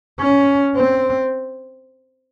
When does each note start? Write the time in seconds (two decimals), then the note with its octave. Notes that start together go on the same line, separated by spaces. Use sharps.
0.20 C#4
0.76 C4